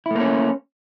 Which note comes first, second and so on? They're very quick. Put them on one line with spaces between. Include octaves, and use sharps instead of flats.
E4 A3 A#3 C#4